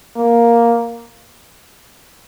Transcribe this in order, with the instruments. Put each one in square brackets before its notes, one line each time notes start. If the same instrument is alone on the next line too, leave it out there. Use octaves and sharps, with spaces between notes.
[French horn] A#3